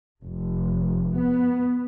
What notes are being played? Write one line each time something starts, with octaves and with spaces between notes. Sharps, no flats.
F1
B3